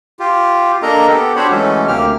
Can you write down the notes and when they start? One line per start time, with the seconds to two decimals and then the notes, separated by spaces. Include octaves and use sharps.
0.20 F4 G4
0.82 A#3 D4 A4 A#4 D#5 A#5
1.08 B3 G4 A4
1.36 D4 F#4 G4 C5 C#5 B5
1.51 E3 F#3 G#3 A3 C#4 A4
1.88 D2 C3 A#3 G4 F6